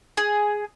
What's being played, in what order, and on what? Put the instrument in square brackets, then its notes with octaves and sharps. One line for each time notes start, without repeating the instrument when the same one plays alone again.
[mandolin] G#4